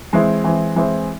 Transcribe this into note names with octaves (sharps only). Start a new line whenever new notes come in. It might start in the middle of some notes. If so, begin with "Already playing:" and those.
E3 G#3 C4 E4
E3 G#3 C4 E4
E3 G#3 C4 E4